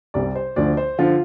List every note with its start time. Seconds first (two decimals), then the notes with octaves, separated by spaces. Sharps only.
0.14 C2 C3 G3 D5
0.35 C5
0.56 D2 D3 F3 D5
0.77 C5
0.99 D3 F3 F4